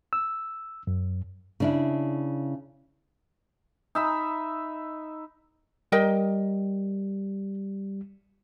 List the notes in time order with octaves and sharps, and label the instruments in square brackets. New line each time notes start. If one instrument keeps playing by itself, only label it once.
[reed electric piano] E6
F#2
[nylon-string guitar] C#3 D4 E4
[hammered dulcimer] D#4 E5 B5
[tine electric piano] G3 [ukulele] A#4 D#5 G5